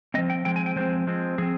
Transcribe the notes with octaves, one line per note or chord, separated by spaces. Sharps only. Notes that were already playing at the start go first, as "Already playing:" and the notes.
F3 G#3 C4 D#5
G5
F3 G#3 C4 G5
G#5
G5
F3 G#3 C4 C5
F3 G#3 C4
F3 C4 G#4